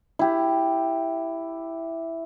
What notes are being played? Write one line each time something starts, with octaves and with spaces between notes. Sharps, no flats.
E4 G4